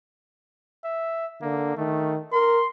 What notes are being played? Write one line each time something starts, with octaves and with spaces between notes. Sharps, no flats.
E5
D3 A#3
D#3 A3
A#4 C6